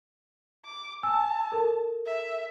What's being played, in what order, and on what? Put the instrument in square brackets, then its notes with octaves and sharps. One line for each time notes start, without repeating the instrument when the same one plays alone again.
[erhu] D6
[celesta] G#5 E6 [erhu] A5
[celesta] A4 A#4
[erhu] E5